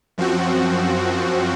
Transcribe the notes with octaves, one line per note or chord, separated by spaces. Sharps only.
F#2 F3 C4 F#4